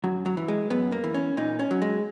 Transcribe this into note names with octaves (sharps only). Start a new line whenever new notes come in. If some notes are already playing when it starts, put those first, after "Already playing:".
F#2 F#3
F#3
E3
G#3
F#2 B3
A#3
E3
C#4
A#2 D#4
C#4
F#3
G#3